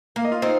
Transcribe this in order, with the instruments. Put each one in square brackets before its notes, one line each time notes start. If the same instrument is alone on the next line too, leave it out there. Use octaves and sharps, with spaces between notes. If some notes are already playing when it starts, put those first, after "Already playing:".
[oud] A#3 [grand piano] F5
[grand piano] D#5
F4 F5
[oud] C4 [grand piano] D#4 D#5